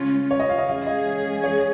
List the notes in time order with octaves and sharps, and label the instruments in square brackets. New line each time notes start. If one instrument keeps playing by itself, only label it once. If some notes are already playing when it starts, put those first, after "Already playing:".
Already playing: [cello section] C#3 G#3 C#4 F4
[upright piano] C#5
D#5
F5
D#5
[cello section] G#3 C#4 G#4 [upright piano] F5
[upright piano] D#5
C#5